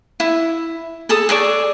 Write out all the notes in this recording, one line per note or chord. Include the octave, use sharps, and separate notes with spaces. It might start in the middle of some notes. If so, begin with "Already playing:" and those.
E4
G#4 A4 A5 D#6
G#4 A4 D5 C#6